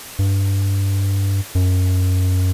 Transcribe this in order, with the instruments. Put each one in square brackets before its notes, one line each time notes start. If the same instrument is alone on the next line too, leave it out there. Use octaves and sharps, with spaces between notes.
[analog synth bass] G2
F#2